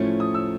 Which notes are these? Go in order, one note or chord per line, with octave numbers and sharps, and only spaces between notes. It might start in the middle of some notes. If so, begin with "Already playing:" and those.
Already playing: A2 F3 A3 C#4
D#6
E6